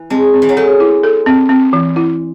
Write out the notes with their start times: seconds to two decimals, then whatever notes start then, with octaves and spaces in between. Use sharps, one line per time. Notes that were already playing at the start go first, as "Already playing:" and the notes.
Already playing: E3
0.10 G#3 C4
0.34 C4
0.42 E3
0.49 F#3
0.57 G#3 A4
0.80 E4
1.03 A4
1.26 C4
1.49 C4
1.73 E3
1.96 E4